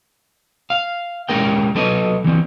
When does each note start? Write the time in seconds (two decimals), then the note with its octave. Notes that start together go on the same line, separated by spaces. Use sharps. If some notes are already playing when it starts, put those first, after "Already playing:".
0.70 F5
1.29 G#3 C#4 A#4 G5
1.75 F#3 A4 B4 D#5
2.24 E3 C4